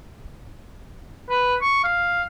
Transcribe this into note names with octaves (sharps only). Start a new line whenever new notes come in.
B4
C#6
F5